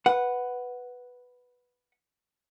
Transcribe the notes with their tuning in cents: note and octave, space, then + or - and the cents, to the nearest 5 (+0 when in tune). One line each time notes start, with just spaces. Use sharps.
B4 +0 F#5 +0